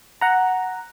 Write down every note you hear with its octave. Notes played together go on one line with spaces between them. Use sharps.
F#5 A#5